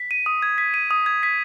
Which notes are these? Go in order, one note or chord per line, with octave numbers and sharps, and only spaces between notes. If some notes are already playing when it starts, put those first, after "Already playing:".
Already playing: B6
D#7
D#6
G#6
B6
D#7
D#6
G#6
B6